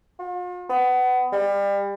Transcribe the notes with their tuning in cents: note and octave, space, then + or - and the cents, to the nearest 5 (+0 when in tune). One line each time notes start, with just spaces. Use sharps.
F4 +45
B3 +25
G3 +30